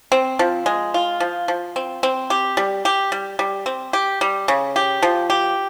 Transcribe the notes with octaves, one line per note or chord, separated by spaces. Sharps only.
C4
F3
G#3
F4
F3
F3
C4
C4
G4
G3
G4
G3
G3
C4
G4
G3
C#3
G4
F3
G4